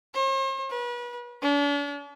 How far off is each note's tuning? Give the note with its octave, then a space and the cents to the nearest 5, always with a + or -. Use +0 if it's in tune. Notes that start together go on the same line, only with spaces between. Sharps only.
C5 +45
B4 -35
D4 -45